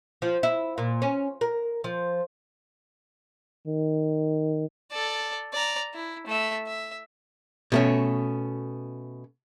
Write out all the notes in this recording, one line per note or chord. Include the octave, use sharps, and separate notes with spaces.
F3
E4
A#2
C#4
A#4
F3
D#3
A4 D5
D5 A#5
E4
A3 E5
E5
B2 A3 C#4